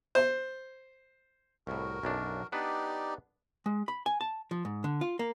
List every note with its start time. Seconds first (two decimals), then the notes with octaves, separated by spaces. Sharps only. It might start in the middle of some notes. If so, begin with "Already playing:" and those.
0.15 C5
1.67 C2 A2 F#4 A#4
2.03 B1 F#2 D4
2.52 B3 D4 D#4 G4 B4 D5
3.66 G#3
3.88 B5
4.06 G#5
4.21 A5
4.51 F3
4.65 G#2
4.84 D3
5.01 F4
5.19 A#3